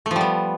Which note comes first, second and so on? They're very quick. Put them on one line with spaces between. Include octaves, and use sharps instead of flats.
A3 F3 G3 B3